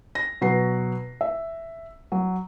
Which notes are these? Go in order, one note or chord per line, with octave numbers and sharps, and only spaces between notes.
A#6
B2 F#3 F#4 B4 F#5 C7
E5
F#3